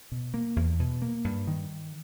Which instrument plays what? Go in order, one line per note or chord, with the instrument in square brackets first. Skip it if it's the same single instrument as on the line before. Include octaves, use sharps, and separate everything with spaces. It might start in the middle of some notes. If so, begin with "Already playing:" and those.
[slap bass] B2
A#3
E2
B2
A#3
G2
D#3